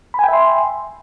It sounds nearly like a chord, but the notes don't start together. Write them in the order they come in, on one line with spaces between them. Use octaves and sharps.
B5 G#5 G5 E5 C6